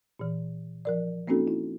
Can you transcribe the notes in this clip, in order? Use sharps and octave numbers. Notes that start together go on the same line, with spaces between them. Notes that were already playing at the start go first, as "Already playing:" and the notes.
A#2 E3
F3 A#4 D5
A#3 C4 C#4 D#4 F#4 A4
E4